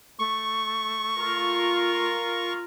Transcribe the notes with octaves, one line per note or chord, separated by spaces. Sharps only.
A3 C#6
F4 A#4